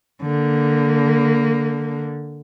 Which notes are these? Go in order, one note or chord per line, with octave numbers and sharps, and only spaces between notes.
D3 A#3